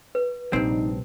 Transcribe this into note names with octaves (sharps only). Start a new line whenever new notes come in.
B4
A#1 G2 C3 C4 D#4